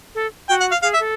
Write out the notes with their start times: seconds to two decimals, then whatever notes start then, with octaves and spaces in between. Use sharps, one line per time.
0.15 A4
0.49 F#4 G5
0.60 F#5
0.72 F5
0.82 G#4 F5
0.94 E5
1.00 A4